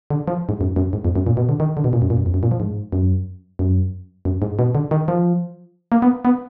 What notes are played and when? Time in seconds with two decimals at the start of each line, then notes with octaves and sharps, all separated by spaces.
0.10 D3
0.28 F3
0.49 G#2
0.61 F#2
0.76 F#2
0.93 G#2
1.05 F2
1.16 F#2
1.27 A#2
1.37 B2
1.49 D3
1.60 D#3
1.77 D3
1.84 B2
1.93 A#2
2.02 F#2
2.10 A#2
2.17 F#2
2.26 F2
2.34 F#2
2.43 A#2
2.51 F3
2.60 G#2
2.92 F#2
3.59 F#2
4.25 F#2
4.42 G#2
4.59 B2
4.75 D3
4.91 D#3
5.08 F3
5.92 A#3
6.02 B3
6.25 B3